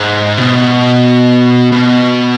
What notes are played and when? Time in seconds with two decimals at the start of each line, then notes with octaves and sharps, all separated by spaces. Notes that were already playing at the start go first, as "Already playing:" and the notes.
Already playing: G#2
0.38 B2
1.72 B2